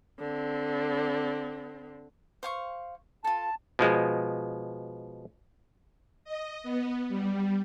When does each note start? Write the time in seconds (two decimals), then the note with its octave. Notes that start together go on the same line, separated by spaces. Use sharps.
0.19 D3 C4
2.43 C5 F5 C#6
3.24 F4 A4 A5
3.79 B2 F3 G#3
6.24 D#5
6.63 B3
7.08 G3